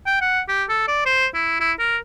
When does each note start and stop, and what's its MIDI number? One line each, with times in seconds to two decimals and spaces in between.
0.06 0.19 79
0.21 0.41 78
0.49 0.64 67
0.69 0.88 69
0.88 1.05 74
1.06 1.27 72
1.34 1.57 64
1.61 1.73 64
1.79 1.97 70